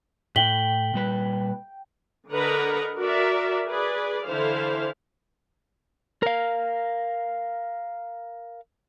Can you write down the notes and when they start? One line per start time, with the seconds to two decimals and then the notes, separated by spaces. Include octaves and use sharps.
0.36 A2 G5 B6 F#7 G7
0.94 A#2 G3 B4
2.31 D3 A#4 B4 D#5 F#5 A#5
2.97 F#4 A#4 D5 E5
3.68 G#4 B4 D5
4.25 D3 E3 E4 A4 C5 F5
6.23 A#4 F5